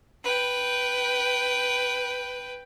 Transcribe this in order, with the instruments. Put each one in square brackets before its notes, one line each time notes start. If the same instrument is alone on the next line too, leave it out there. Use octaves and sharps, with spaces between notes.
[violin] B4 G5